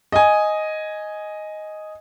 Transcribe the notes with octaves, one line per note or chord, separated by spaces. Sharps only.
D#5 G#5